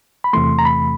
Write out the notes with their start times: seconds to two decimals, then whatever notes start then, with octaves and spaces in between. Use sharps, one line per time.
0.24 B5
0.33 E2 C3 E3 A3 C6
0.59 A#5
0.65 B5